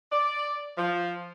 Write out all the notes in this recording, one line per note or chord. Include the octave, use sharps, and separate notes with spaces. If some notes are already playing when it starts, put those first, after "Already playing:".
D5
F3